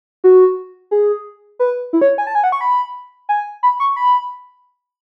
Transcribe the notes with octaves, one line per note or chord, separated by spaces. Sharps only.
F#4
G#4
B4
E4
C#5
G#5
A5
G#5
F#5
C#6
B5
G#5
B5
C#6
B5